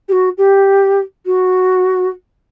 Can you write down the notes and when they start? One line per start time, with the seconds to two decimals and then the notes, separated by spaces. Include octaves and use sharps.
0.08 G4
0.12 F#4
0.37 G4
1.26 F#4